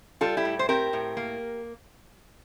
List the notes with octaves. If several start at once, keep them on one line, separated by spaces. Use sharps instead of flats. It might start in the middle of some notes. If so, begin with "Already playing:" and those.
G3 F4 A4
E4 G4
A2
C5
C4 G4 A#4
A2
A#3